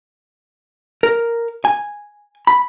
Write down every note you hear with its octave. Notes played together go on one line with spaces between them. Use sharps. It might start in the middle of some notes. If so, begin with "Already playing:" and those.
A#4
G#5
B5